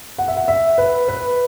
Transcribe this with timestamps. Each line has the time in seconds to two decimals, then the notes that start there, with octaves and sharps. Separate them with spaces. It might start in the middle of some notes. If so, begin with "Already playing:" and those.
0.18 F#5
0.28 E5
0.37 F#5
0.48 E5
0.78 B4
1.08 B4